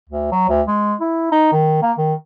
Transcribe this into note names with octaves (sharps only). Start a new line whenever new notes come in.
D2
F#3
D2
G#3
E4
D#4
D#3
A#3
D#3